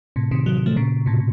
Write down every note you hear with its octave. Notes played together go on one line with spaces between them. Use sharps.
A2 C3
C3 D#3
D#3 F#3
D#3 F#3
F3 A3
A#2 C#3
A2 C3